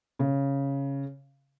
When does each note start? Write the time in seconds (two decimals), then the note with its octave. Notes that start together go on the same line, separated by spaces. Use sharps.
0.19 C#3